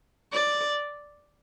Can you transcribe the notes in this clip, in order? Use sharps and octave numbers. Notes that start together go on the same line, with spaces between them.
D5